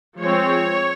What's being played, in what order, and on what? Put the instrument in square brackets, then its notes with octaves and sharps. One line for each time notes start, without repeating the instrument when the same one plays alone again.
[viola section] F3 G#3 C4 C#5